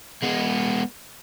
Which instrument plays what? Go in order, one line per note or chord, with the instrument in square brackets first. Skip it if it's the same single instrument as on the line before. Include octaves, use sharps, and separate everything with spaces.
[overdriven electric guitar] G#3 B3